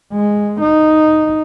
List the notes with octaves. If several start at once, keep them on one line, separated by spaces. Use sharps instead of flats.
G#3
D#4